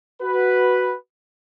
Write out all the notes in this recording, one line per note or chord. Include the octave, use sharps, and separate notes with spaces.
F#4 B4